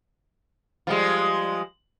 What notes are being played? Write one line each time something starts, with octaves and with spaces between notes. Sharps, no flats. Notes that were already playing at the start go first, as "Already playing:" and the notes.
F3 G3 G#3